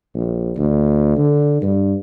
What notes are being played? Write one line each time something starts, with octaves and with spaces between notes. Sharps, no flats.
A#1
D2
D3
G2